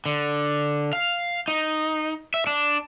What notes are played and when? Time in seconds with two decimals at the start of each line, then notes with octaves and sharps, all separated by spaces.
0.06 D3
0.93 F5
1.48 D#4
2.34 E5
2.47 D4